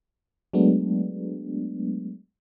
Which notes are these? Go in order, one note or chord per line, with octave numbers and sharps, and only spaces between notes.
F#3 G#3 A3 B3 D4